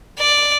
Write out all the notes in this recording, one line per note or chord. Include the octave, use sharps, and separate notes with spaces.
D5